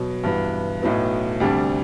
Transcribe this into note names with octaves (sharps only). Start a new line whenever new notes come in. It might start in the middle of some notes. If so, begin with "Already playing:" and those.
Already playing: B2 F#3
G2 E3 B3 F#4
B1 A2 F#3 B3
D2 C3 G3 D4